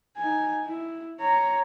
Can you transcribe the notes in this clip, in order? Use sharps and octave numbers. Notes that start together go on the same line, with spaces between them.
D#4 G#5
E4
C#5 A#5